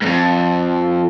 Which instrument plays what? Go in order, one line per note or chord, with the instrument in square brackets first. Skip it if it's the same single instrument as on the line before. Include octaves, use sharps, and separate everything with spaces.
[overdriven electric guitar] F2 G#2